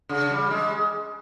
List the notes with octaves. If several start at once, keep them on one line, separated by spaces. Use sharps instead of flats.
C#3
G3
G#3